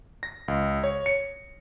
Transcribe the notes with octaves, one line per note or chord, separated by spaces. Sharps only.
A#6
C#2
C#5
C#7